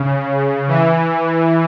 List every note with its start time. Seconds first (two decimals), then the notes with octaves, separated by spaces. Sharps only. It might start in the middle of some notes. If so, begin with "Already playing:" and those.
Already playing: C#3
0.68 E3